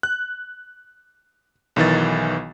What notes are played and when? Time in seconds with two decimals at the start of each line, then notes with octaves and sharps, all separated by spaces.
0.03 F#6
1.76 B1 D#3 E3 A6